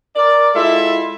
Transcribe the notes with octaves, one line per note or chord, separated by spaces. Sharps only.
A#4 D5
G#3 E4 F4 A4 E5